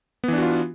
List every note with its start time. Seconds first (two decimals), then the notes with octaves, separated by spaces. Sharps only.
0.24 B3
0.28 E3
0.33 D4
0.38 F#4
0.42 F4